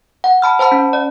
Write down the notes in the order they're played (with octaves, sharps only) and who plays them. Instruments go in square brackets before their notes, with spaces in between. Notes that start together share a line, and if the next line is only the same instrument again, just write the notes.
[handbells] F#5
A5 B5 F6
C5 F#5 A5 B5
C#4
D5